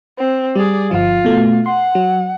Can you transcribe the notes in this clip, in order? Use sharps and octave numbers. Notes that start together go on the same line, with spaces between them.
C4
G3 G#4 D5
G1 F3 F4
B2 A3
F#5 C6
F#3